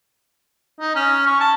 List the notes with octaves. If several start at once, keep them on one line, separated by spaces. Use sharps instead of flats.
D#4
C#4
C#6
A5